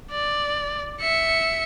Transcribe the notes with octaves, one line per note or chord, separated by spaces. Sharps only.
D5
E5 C#7